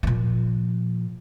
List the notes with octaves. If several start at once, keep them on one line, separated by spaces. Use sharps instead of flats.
A#2 F3